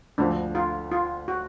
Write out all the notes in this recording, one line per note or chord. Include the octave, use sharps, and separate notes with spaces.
D2 D3 F3 D4
F4
F4
F#4